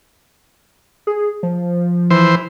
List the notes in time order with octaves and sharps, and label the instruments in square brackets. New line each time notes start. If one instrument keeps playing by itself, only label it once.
[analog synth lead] G#4
F3
[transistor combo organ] E3 C5